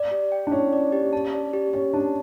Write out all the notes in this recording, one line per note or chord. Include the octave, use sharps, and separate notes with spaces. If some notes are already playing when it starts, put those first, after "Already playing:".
Already playing: D5
G4
G5
D4
C#4 E4
D5
G4
A5
D5
G4
C#4 G4
D4 A5